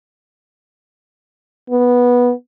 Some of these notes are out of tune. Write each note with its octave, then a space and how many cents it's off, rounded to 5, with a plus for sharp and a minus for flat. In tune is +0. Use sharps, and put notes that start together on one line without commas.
B3 -10